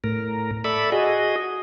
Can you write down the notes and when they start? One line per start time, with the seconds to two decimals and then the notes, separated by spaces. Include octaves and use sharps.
0.04 A2 A#4
0.64 A4 D5 E5 B5
0.92 F#4 G#4 D#5